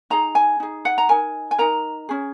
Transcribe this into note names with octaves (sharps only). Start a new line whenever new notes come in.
D#4 G#4 A#5
G#5
D#4 G#4
F#5
A#5
D#4 A#4 G#5
G#5
D#4 A#4 A#5
C#4 G#4